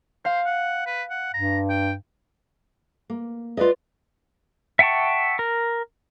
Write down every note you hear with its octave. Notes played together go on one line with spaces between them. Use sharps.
C5 F5
F#5
B4
F#5
G2 A#5
G5
A#3
F4 B4 D5 D#5
E5 F#5 G5 A5 C#6
A#4